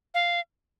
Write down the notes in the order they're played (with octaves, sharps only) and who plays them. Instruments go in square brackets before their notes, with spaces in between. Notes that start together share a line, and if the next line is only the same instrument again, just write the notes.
[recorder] F5